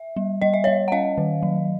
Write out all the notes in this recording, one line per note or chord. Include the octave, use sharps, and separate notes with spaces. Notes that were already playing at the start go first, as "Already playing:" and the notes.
Already playing: E5
G3
G3 D#5
E5
G3 C#5 D#5
F#5
C#4 D#5 F5
D#3
F#3